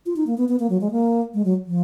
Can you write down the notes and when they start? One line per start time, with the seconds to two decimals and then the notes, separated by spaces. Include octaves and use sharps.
0.06 F4
0.16 D#4
0.27 A#3
0.38 B3
0.48 B3
0.59 A#3
0.70 F#3
0.81 G#3
0.91 A#3
1.34 G#3
1.45 F#3
1.66 F3